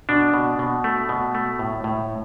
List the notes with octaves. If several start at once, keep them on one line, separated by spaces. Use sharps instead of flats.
B2 D4
B2
B2
A3
B2
A3
A2
A2